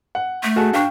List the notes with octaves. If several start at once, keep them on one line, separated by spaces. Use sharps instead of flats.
F#5
A3
F#4 G#4 A4
D4 F5 G5 C#6